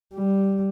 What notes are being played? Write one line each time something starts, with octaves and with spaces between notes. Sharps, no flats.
G3